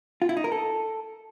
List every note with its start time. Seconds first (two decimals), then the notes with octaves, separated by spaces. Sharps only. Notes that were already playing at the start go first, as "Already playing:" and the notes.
0.22 F4
0.29 E4
0.37 D#4
0.44 A#4
0.52 A4